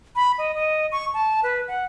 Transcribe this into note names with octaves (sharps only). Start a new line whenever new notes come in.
B5
D#5
D#5
C#6
A5
B4
F#5